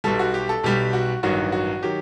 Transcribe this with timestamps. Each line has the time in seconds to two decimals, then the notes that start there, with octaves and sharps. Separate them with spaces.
0.04 B1 B2 G3 A4
0.19 F#4
0.34 G4
0.49 A4
0.64 B1 B2 G3 G4
0.93 F#4
1.23 A1 G2 D#3 F#3 F#4
1.52 F#4
1.83 D#3 F#3 G4